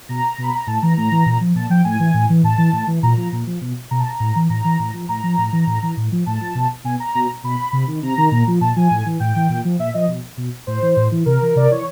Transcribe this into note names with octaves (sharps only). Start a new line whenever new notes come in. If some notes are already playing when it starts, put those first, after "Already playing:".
B2 A#5
B2 B5
A#5
A2 A5
E3 A#5
A2 A#5
E3
A#2
F3
A#2 A5
F3 G5
A2 G#5
E3
A2
E3
A2 A5
E3
A2
E3
A#2 A#5
F3 A#5
A#2
F3
B2
B2 A#5
A5
A#5
A2
E3
A2 A#5
E3
A2
F3
A2 A#5
F3
A2
E3
A2
E3
A2
F3
A2 A5
F3
B2
B2 G#5
A#5
B2
B2 B5
C3
D#3
C3 A#5
D#3
A#2
F3
A#2 A5
F3 G#5
A2
E3
A2 G5
E3
A#2
F3
A#2 E5
F3 D#5
B2
B2
A2 C5
E3
A2
E3
C3 A#4
E3
C3 D5
E3 C#5